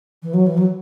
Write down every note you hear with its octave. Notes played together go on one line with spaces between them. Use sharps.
E3
F#3
E3
F#3